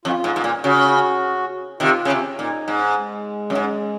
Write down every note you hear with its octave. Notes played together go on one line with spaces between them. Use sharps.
F2 F4
G#2
G#2
A#2
C#3 F#4
C3 D#3 F4
C#3
C3
A#2 D#4
G#2
G#3
F#2
G#2